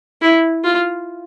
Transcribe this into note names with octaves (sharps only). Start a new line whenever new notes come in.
E4
F4